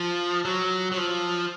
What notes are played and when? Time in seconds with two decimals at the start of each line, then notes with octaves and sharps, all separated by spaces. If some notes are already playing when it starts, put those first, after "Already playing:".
Already playing: F3
0.45 F#3
0.92 F#3
0.97 F3